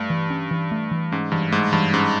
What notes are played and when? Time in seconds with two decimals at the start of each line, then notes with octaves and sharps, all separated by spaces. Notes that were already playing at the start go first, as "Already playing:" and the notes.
Already playing: G2 A3
0.10 E3
0.30 C#4
0.51 E3
0.71 A3
0.91 E3
1.12 G#2 C#4
1.32 G2 E3
1.52 G#2 A3
1.72 G2 E3
1.93 G#2 C#4